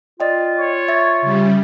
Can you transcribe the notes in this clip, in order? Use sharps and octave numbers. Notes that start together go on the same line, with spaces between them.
F4 D5 D#5 G5
C#5
E5 A6
C#3 G3